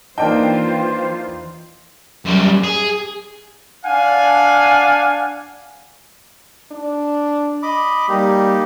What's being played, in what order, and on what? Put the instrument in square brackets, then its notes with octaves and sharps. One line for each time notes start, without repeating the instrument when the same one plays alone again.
[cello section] E3 F4 C5 [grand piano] A#3 D4 D#4 [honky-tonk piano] G5
[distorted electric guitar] F#2 G3
G#4
[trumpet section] D4 F5 F#5 G#5
[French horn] D4
[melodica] D#5 B5 D6
[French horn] G3 [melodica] A#3 D#4 G4